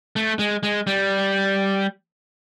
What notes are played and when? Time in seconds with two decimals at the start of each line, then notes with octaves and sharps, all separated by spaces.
0.16 A3
0.39 G#3
0.63 G#3
0.87 G3